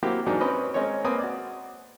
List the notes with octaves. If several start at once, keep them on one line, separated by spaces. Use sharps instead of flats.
F#3 A#3 C4 E4 F#4 G4
E2 G#2 F#3 D4 A#4
C4 C#4 B4 D#5 B5
G#3 C4 C#4 A#4 C#5
A#3 C4 B4 G#5 D#6
F#4 D5